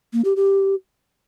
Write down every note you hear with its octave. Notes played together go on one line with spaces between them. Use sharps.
A#3
G4
G4